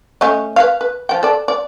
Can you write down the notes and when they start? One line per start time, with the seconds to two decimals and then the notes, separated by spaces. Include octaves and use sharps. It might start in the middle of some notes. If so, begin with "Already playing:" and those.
0.21 A3 C#4 D#5
0.56 B4 C#5 F5
0.81 B4
1.09 F3 G5
1.23 A4 D5
1.48 D5